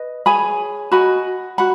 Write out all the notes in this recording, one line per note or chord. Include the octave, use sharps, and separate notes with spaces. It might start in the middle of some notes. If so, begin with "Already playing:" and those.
Already playing: B4 D#5
G#4 C#5 G#5 B5
F#4 D#5 G#5 B5
F#4 F#5 B5